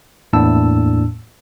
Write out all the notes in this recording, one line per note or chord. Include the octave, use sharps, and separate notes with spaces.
E2 A2 A#3 D4 A5 E6